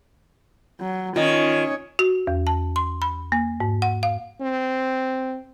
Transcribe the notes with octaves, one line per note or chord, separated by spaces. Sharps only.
F#3
D#3 C#4 F4 C#5 D#5
F#4
E2
A5
C6
B5
A#3
G#2
F#5
F5
C4